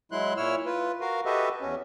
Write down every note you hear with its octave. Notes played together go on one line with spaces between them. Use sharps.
F#3 G#3 E4 C6 F#6
A#2 E4 C#5 E6 F6
F4 B4
F#4 A#4 F5
F#4 G4 A4 B4 D#5 E5
E2 C#4